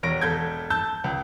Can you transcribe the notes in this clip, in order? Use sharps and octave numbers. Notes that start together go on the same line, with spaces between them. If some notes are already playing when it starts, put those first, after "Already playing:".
E1 C#5 A#6 D7
E1 A4 G6 G#6
A5 E6 G6
C#2